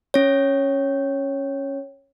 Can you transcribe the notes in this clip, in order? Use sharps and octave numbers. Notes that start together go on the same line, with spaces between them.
C#4 C#5